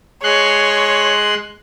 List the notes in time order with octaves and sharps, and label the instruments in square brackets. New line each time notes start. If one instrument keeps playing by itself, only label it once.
[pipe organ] G#3 C6 F#6 [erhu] C#5